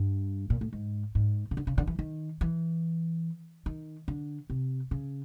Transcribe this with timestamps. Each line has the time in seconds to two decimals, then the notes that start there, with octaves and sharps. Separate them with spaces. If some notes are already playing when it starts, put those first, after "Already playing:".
Already playing: G2
0.50 A#2
0.61 A2
0.73 G#2
1.15 G#2
1.51 C#3
1.57 D3
1.67 C#3
1.78 D3
1.87 E3
1.99 D#3
2.41 E3
3.66 D#3
4.08 D3
4.50 C3
4.91 C#3